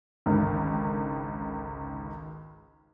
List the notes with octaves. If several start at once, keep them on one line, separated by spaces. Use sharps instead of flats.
G#1 C#2 D3 D#3